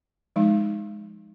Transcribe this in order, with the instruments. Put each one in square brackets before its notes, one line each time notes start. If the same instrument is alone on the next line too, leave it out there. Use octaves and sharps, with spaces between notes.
[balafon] F3 G#3 D#4